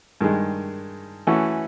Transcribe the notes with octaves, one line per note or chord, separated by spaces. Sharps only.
G2 D#3 G#3
E3 A3 C#4 F#4